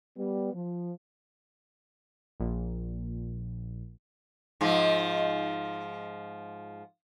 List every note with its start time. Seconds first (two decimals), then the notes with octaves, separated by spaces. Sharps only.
0.17 G3 B3
0.54 F3
2.40 A#1 A#2
4.61 G#2 F3